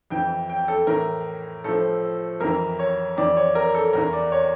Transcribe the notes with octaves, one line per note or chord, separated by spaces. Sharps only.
F2 E3 G5
G5
A4
A2 E3 A#4
A2 F3 A4
F2 E3 A#4
C#5
F2 E3 D5
C#5
A#4
A4
E2 E3 A#4
D5
C#5